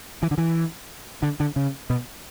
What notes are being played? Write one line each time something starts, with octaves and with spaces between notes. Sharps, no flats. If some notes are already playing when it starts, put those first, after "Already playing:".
E3
D3
E3
D3
D3
C#3
B2